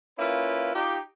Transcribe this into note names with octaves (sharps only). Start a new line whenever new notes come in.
A#3 C#4 E4 F4 B4
D#4 F4 G4